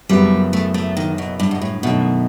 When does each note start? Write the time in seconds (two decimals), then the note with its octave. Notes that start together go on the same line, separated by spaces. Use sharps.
0.09 F#1 F#2 F#3 G3 B3
0.53 A3
0.74 A3
0.97 D#3
1.18 B2
1.40 G2
1.51 B2
1.61 A2
1.83 F#2 B2 D#3 A3